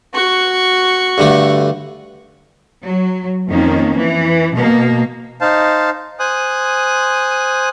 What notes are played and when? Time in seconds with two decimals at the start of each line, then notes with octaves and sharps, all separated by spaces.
0.14 F#4 C#6
1.18 G2 D3 A3
2.84 F#3
3.49 F2 D#3 A#3 C#4
3.95 E3
4.54 B2 A#3
5.40 D#4 C5 F5 A5
6.20 C5 G#5 D#6 F#6